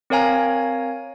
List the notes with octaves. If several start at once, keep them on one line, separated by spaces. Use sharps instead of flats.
C4 A#4 C#5 F5 G#5 A#5